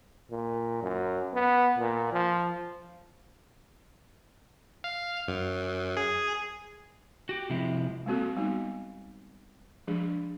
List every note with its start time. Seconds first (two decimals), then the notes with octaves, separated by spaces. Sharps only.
0.31 A#2
0.82 F#2
1.34 B3
1.78 A#2
2.12 F3
4.84 F5
5.28 F#2
5.97 G#4
7.29 F#4 G4
7.50 C3 F3 G#3 E4
8.06 G#3 A#3 C4 F#4 A4
8.36 G3 G#3 B3 D#4 F#4
9.87 F3 G#3 D4 G#4